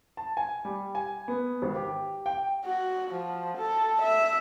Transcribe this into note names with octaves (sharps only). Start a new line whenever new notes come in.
A5
G#5
G3
G#5
B3
G#1
G4
G5
F#4
F3
A4
E5